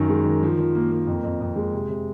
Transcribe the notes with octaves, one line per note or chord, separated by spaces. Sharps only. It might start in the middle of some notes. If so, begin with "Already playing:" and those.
Already playing: F#2 D#3 D#4
G#3
D#3
F3
F3
A#3
A#3
F2
F2
F2
G#3
C3
C3